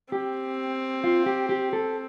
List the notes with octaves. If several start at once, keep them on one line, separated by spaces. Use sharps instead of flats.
C4 G4
F4
G4
G4
A4